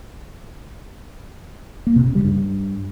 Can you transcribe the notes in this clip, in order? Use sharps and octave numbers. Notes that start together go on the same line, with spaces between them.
A#3
C3
C#3
G3
G2